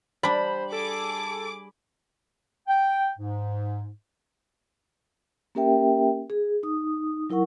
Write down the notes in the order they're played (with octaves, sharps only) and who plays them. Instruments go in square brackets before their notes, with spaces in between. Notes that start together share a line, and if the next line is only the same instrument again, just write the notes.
[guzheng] G3 D4 [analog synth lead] C5 [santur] B5
[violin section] G#4 D6 [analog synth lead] A4
[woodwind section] G5
G#2
[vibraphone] A#3 C#4 G4 A#4 E5 G5
G#4
D#4 D#6
F#3 E4 A#4 F#5 C#6